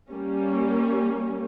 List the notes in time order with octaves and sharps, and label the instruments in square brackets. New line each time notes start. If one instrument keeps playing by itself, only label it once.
[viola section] G3 A#3 C#4